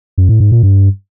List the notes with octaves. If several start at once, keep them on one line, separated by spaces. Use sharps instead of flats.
F#2
A2
G#2
A#2
G2